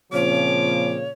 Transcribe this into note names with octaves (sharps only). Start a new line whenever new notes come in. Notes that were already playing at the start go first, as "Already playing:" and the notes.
A#2 C#3 F3 C4 C#5 D6